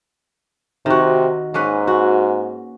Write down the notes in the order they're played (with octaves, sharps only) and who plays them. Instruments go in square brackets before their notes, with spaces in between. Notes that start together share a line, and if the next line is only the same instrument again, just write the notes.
[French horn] C3 [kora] D#3 F#4
[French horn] G#2 [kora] A#3 C#4 B4
[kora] F#4